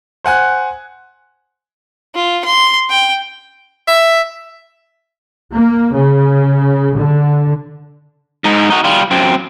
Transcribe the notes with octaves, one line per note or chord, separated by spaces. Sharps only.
C5 F#5 G#5 F#6
F4
C6
G5
E5
A#3
C#3
D3
G#2 D#4
D#4 F#4
G3 F4
F#2 C4